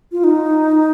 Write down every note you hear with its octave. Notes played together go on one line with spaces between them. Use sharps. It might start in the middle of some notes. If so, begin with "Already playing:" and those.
F4
D#4